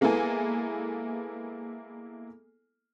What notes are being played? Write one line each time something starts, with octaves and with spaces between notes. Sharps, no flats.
G#3 A#3 B3 E4 A4 G#5